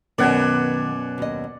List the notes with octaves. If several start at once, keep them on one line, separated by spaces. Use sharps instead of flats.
F#2 B2 D#3 B3 B4 D5 F#5 G#5
D#2 D#5